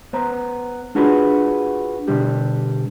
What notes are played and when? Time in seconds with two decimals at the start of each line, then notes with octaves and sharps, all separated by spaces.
0.13 B3 C5 A#5
0.95 D4 F4 F#4 G#4 B4
2.08 B2 D3 G3 G4